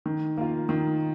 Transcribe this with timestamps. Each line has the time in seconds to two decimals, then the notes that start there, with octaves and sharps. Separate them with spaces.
0.06 D#3
0.37 A#3 F4
0.69 D#3